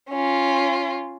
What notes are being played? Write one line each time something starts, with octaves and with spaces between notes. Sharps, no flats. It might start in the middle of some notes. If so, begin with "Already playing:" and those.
C#4 F4